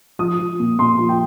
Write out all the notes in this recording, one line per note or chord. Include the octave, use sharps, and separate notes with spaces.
F3 D#6
F3
A#2
A#2 C6
F3
G5